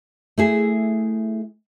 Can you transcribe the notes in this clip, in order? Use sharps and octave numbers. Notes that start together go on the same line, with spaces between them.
A3 E4 G#4